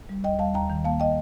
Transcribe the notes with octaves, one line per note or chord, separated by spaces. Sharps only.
G3
D#2 D#5 G5
G3 F5 A5
D#2 G5 A#5
D#3
A#3 F5 A5
D#5 G5